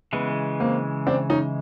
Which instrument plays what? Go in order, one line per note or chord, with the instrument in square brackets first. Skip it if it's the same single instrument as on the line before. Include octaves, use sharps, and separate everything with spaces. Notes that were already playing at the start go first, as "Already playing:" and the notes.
[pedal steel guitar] C#3 E3 G#3 [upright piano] B3
[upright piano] A#3 C4
C4 D4
C#4 D#4